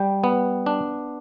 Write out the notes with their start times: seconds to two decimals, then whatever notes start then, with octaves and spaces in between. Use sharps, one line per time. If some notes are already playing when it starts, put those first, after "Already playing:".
Already playing: G3 G5
0.24 B3
0.66 D4